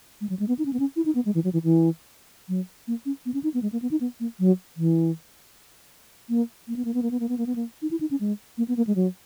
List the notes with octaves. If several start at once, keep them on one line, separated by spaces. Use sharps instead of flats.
G#3
F#3
G#3
B3
D#4
C#4
B3
C#4
E4
D#4
B3
G#3
E3
F#3
E3
E3
F#3
A#3
C#4
B3
C#4
D#4
B3
G#3
A#3
B3
D#4
B3
A#3
F#3
E3
A#3
A#3
B3
A#3
B3
A#3
B3
A#3
B3
A#3
B3
A#3
D#4
E4
D#4
C#4
G#3
A#3
B3
A#3
G#3
F#3